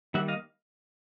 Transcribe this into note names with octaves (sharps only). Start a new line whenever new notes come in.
D#3 G3 A#3 E5 F#5
D#5 F5